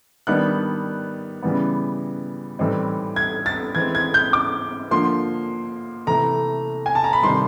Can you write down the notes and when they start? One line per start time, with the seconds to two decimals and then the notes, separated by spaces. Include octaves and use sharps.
0.27 D#3 G3 B3 D4 F#6
1.43 C#3 E3 G3 B3
2.59 A2 E3 G3 C4 D#4
3.16 G#6
3.46 A6
3.75 E3 G#3 C4 G#6
3.95 G#6
4.14 G6
4.33 D6
4.91 D3 F3 A#3 C6
6.07 C3 E3 A3 A#5
6.86 G#5
6.95 A5
7.04 A#5
7.13 B5
7.23 C3 D#3 G3 C6